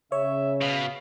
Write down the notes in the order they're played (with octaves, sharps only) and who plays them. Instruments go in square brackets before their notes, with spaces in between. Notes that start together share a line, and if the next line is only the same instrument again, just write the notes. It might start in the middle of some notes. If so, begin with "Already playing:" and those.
[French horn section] C#3 [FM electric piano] C#5 [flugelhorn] E5
[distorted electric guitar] B2 [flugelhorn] F5